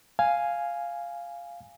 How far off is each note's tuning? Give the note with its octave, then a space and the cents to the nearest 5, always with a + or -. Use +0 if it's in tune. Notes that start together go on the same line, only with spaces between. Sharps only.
F5 +0 G#5 +0